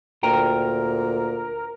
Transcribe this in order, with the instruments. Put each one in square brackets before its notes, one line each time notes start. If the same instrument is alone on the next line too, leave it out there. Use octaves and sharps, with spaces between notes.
[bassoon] D2 [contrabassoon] A#2 [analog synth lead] A#4 [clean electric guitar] G5 A#5